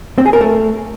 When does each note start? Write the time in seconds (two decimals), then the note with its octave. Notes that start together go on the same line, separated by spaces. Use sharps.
0.18 C4
0.26 G#4
0.33 A#4
0.41 A3